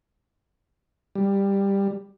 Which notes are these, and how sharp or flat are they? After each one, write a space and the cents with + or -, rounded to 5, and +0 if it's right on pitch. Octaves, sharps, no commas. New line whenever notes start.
G3 +10